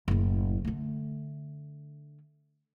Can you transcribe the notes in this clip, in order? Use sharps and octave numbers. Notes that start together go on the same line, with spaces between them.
F#1 A2
D3 A3